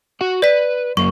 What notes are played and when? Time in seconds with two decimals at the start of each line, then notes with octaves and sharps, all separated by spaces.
0.21 F#4 F#5
0.42 B4 D5 B6
0.97 F#2 A#3 C#6